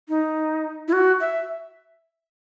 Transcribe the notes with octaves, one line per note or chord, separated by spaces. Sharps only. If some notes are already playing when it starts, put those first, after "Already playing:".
D#4
E4
F#4
E5